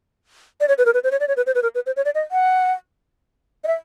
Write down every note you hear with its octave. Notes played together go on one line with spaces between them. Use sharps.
D5
C#5
B4
A#4
B4
C5
C#5
D5
C#5
B4
C5
B4
A#4
B4
C5
C#5
D5
D#5
F#5
D#5
E5